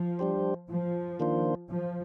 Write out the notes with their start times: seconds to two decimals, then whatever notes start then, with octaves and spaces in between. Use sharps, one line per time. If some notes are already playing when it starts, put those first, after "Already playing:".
Already playing: F3
0.19 G3 D4 G4 C5
0.70 F3
1.20 D#3 A#3 D4 F4 C5
1.70 F3